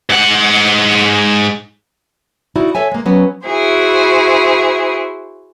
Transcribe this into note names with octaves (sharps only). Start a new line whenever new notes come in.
G#2 F#5
D#4 E4 F#4 D5
A4 C#5 E5 G#5
G#3 A#3
F#3 B3 C#4
E4 F#4 G#4 C5